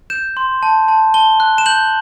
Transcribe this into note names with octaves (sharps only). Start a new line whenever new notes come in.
G6 E7
C6
A5
A5
A5 G7
F#6
E7
G6 F#7